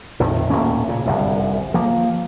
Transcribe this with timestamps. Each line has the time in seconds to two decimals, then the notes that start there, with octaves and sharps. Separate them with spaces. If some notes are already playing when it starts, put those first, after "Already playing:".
0.20 A#1 F2 A2 D#3
0.50 D#1 A2 A#3 C#4
0.88 A#2 C#3
1.06 G1 C2 F#2
1.74 F3 A#3